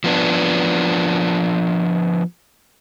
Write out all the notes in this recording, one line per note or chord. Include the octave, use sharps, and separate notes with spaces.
F3 B3 D4